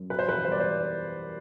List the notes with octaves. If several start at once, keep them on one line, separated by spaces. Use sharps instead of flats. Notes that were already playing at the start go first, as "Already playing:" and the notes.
Already playing: F#2
B2 B4
C5
E2 B4
G3 C5
D5
C5